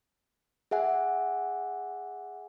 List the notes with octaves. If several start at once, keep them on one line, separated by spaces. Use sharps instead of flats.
G#4 E5 F#5 G#5